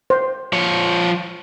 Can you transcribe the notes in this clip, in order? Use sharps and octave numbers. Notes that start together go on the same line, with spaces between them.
C5
F3 C#5